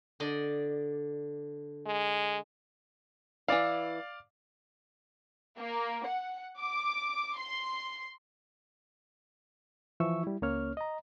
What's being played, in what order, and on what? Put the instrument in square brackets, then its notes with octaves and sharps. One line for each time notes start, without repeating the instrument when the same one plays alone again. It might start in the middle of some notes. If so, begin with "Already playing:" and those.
[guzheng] D3 D5 D#5
[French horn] G#3
[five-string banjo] E3 E4 [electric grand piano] D5 F5
[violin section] A#3
F#5
D6
C6
[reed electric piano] E3 F3 E5 C#6 E6
G3 E4
C#2 A#3 C#4 C#5 F6
D#5 A#5